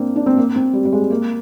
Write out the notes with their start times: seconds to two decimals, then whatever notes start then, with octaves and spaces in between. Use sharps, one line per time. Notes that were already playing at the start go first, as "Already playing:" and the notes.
Already playing: A#3 C4 D4
0.16 D4
0.26 C4
0.37 A#3
0.56 C4
0.73 G3
0.85 G3
0.92 G#3
1.10 A#3